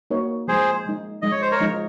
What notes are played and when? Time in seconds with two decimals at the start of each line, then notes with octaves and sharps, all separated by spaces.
0.10 A#3 D#4 F#4 A#4 C#5
0.48 F3 G#3 D#4 G#4 C5
0.85 F3 G#3 D#4
1.22 F3 G#3 D#4 D#5
1.32 C#5
1.42 C5
1.51 A#4 C#5
1.60 F3 G#3 D#4